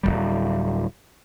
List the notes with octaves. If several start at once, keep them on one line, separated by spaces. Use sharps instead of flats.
D1 C#2 G3